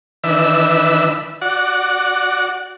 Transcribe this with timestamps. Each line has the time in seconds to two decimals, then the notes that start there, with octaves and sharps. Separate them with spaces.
0.24 D#3 E3 D4 B4 E5 E6
1.41 F#4 D5 F#5